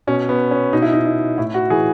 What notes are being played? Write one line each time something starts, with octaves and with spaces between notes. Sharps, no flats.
B2 C#4
B3
C#4
B2 D#4
E4
D#4
D#4
A2 E4
F#4
E3 G#4